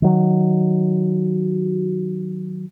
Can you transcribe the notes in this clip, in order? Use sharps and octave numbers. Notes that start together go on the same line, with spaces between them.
D#3 F#3